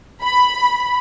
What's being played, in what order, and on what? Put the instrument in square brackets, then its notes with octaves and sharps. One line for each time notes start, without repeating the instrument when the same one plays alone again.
[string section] B5